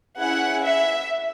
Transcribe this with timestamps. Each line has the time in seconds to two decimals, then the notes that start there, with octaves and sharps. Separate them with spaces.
0.19 C#4 E4 G#4 F#5
0.64 E5